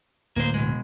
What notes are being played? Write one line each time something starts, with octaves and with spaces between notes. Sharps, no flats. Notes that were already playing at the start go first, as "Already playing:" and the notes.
D1 A#3 C5
B2 G#3